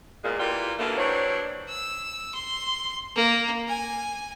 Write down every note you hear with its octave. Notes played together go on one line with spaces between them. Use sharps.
E2 A#2 G#3
A#2 E3 G3 F4 G4
B2 D3 A3 A#3
E3 F#3 G3 D4 C5 C#5
E6
C6
A#3
G#5